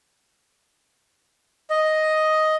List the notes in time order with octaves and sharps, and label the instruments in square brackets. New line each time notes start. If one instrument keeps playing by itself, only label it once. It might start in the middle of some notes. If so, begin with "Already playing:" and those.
[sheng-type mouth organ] D#5